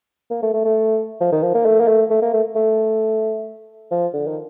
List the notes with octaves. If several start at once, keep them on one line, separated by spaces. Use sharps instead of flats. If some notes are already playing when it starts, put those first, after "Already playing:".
A#3
A3
A3
A3
F3
D#3
F3
A#3
A3
A#3
A3
A3
A#3
A3
A3
F3
D3
D#3